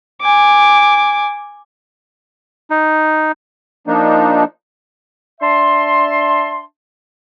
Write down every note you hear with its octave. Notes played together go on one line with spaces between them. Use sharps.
G#5 D6
D#4
F3 A#3 D4 D#4
D4 E5 A5 C6